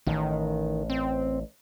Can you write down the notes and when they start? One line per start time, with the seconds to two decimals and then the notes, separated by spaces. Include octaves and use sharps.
0.07 A1 D#3
0.90 C4